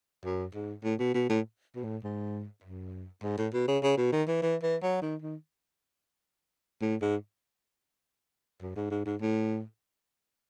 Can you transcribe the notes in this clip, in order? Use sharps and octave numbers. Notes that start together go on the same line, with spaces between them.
F#2
G#2
A2
B2
B2
A2
B2
A2
G#2
F#2
G#2
A2
B2
C#3
C#3
B2
D#3
E3
E3
E3
F#3
D#3
D#3
A2
G#2
F#2
G#2
G#2
G#2
A2